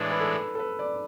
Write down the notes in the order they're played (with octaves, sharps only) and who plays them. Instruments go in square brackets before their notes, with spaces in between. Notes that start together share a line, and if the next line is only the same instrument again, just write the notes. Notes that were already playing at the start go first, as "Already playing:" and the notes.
Already playing: [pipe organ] A2 E3 G#3 D4 [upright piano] B4
[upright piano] B4
A4
A4
B4
D5